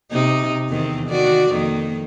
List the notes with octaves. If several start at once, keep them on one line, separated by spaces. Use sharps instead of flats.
C3 D#4
E2 D#3 C4
D#3 F#4 D5
F2 D#3 A#3